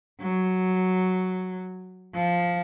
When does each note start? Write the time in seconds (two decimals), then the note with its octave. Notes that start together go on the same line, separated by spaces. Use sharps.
0.21 F#3
2.15 F3